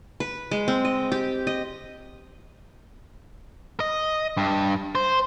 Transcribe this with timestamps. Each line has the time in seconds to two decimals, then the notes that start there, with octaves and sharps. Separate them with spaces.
0.20 B4
0.51 G#3
0.68 C4
0.85 D#5
1.12 G4
1.47 D#5
3.80 D#5
4.37 G2
4.95 C5